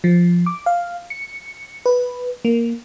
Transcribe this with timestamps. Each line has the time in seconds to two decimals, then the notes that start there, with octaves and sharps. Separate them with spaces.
0.04 F3
0.46 D6
0.66 F5
1.10 C#7
1.86 B4
2.45 A#3